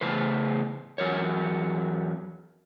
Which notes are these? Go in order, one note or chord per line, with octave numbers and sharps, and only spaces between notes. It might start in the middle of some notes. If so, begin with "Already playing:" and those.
A2 C#3 B4 C5
E2 F#3 A#4 C#5